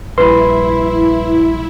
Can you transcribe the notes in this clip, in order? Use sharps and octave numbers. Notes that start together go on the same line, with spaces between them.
A#1 G2 E4 B4 B5 C6